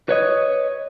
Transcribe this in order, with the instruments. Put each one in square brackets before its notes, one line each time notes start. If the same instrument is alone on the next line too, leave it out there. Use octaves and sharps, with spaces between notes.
[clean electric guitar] B4 C#5 D#5